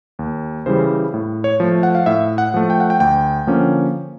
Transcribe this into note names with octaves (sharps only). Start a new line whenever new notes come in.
D#2
C#3 E3 G3 C5
A2
C#5
F3 A3
F#5
F5
A2 E5
F#5
F3 A3
G5
F#5
G5
D2 G5
D3 F3 A#3 C#4